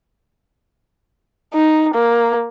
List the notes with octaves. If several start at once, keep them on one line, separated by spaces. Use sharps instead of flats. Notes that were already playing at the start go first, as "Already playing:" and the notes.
D#4
A#3